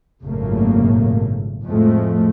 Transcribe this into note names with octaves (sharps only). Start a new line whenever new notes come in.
G#1 F#2 A#2 C#3 A3 A#3
F2 A2 F3 G#3 A3